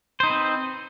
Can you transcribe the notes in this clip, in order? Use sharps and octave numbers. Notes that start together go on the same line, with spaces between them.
C4 D#4 B4 C5